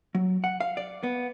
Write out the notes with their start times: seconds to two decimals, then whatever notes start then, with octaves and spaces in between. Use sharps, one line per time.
0.15 F#3
0.44 F#5
0.61 F5
0.77 D5
1.03 B3